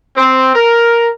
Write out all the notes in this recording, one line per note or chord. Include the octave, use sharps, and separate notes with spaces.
C4
A#4